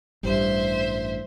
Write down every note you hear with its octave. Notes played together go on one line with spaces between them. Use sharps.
A1 G2 G3 C5 E5